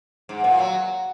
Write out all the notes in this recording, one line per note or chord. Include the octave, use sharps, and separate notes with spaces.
G#2
A#2
F#3